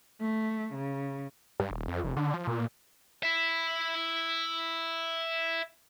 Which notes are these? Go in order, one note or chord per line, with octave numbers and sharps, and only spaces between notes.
A3
C#3
G2
D#1
F2
F1
D3
F3
A#2
E4 E5